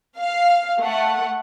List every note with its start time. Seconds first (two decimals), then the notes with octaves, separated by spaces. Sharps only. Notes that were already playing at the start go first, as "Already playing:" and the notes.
0.17 F5
0.79 A3 F#5